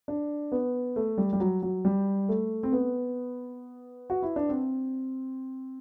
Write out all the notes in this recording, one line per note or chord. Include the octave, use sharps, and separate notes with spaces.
D4
B3
A3
G3
G3
F#3
F#3
G3
A3
C4
B3
F#4
E4
D4
C4